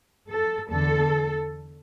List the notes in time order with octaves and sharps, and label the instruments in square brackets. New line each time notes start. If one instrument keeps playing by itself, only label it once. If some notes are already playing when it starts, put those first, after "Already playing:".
[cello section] A4
E2 D3 A4